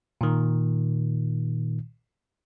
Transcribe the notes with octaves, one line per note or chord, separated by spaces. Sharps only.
A#2 D#3